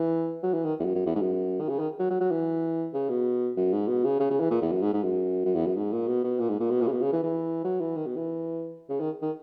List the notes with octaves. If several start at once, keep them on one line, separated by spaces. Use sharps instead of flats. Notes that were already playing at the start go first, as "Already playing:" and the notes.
Already playing: E3
F#3
E3
D#3
E2
F#2
F#2
E2
G#2
F#2
D#3
C#3
D#3
F#3
F#3
F#3
E3
C#3
B2
F#2
G#2
B2
C#3
C#3
C#3
E3
A#2
E2
F#2
G#2
G#2
F#2
F#2
E2
F#2
G#2
A#2
B2
B2
A#2
G#2
A#2
B2
A#2
C#3
B2
C#3
E3
E3
F#3
E3
D#3
B2
E3
C#3
D#3
D#3